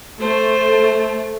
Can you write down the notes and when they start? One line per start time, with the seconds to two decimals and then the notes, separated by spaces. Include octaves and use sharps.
0.20 A3 C5